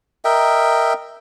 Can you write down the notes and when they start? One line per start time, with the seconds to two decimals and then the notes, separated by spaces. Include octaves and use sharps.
0.25 A#4 D#5 E5 G5